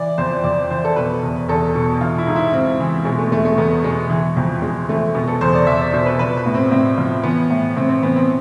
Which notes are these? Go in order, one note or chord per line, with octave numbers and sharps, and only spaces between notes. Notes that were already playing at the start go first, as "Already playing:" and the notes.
Already playing: E3 D5
F2 C5
F2 D5
E3 C5
A4
B2 B4
E2
E2 A4
B2
E3 F4
E4
G#2
E4
G#2 C4
E3
B2 G#3
A3
E2 A3
A3
E2 B3
B2 G#3
E3
F2
F2 G#3
E3 A3
B2 B3
A4
E2 C5
D5
E2 E5
D5
B2 C5
B4
F3 B4
B4
A2
C4
A2 C4
F3
E3 B3
A2
A2 C4
C4
E3 B3
C4